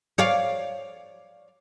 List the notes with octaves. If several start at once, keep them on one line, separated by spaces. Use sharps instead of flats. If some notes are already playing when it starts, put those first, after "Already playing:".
C#5 D5 F5